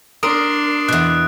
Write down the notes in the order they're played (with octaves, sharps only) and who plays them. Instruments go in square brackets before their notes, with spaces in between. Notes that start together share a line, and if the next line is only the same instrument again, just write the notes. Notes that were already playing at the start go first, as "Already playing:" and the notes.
[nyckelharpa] D4 C6 [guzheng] A#4 [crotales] D#6 D7
[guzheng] E2 B2 [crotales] F#6